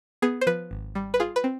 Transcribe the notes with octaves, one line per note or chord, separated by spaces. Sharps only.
B3 G#4
C5
F3 B4
G#1
G3
B4
F4 G#4
B4
C4